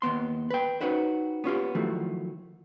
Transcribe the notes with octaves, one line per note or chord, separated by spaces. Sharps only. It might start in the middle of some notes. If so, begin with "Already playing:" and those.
D#2 G#2 B3 C6
B4 G5
C#4 D#4 F#4 B4 C5
B3 C#4 F4 G4
D#3 F3 F#3 A3 E4